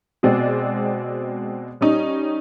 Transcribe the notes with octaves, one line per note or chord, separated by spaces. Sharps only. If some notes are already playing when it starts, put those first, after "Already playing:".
B2 G#3 C4 D5
G3 C#4 D#4